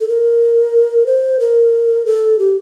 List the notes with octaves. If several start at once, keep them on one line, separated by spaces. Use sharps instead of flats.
A4
A#4
C5
A#4
A4
G4